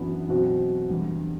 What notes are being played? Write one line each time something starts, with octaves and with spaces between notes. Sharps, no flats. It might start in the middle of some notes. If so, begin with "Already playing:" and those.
Already playing: F#2 E3 B3 D4 F#4
B2 F#3 C4 F#4
E2 D3 G3